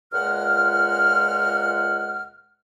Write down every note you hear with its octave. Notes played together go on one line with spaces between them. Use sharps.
C#2 A#2 G#3 F#5 F6